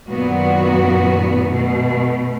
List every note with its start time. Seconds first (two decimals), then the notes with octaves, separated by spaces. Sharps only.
0.10 F#2 A#2 D#3 B3 F#4
1.51 B2 A3